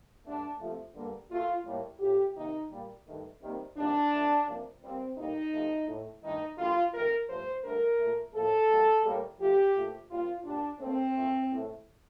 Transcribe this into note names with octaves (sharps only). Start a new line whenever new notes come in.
G2 D3 A3 D4
C3 F3 A3
G2 D3 G3 A#3
A#2 A3 F4
A2 G3 A#3
A2 F3 A3 G4
C3 D#3 A#3 D#4
A#2 G3 A#3
G2 D#3 A3
C3 D#3 G3 A#3
F2 C3 D#3 G3 A#3 D4
F2 D3 A3
C3 F3 A#3
C3 G3 A#3 C4
A2 G3 A#3 D#4
C3 F3 A3
A2 A3
G2 D#3 A3 D#4
F2 D3 G3 A#3 F4
F2 C3 D#3 A3 A#4
G2 F3 A3 C5
G2 D3 A3 A#4
A#2 A3
A2 F3 A#3 A4
F2 C3 G3 A#3
A2 G3 A#3
C3 F3 A3 G4
A#2 F3 A3
C3 G3 A#3 F4
A#2 G3 A#3 D4
A#2 A3 C4
A#2 F3 A3
A2 A3